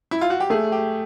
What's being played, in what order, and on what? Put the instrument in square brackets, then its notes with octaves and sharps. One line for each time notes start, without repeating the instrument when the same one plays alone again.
[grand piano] E4
F4
F#4
G4
[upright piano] A3 [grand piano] G#4
[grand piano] G4